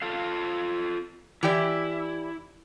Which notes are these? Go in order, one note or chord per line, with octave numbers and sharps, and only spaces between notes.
F4 A4 F5
E3 E4 G4 D5